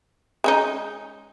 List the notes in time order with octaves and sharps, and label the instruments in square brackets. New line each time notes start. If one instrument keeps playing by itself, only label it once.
[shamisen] G#3 C#4 D#4